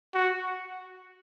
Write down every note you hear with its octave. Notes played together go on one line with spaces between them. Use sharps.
F#4